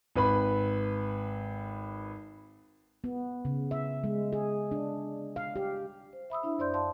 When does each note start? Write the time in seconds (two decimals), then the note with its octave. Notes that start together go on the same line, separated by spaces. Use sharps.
0.16 G#1 B4 B5
3.04 B3
3.45 C#3
3.71 E5
4.04 G#3
4.33 G#4
4.71 D4
5.36 F5
5.56 G4
6.13 C5
6.30 E5 B5 D#6 E6
6.43 D4 E4 E5
6.59 F#2 C5 D5 C6 G6
6.74 D5 F5 A5 C6